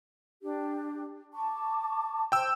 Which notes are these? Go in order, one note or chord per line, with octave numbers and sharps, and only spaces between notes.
D4 G4
A5 C#6 D6
C5 G5 E6